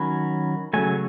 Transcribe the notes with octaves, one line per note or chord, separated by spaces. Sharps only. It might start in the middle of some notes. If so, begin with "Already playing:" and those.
Already playing: D#3 F#3 C#4 B5
C#3 F#3 A3 G#5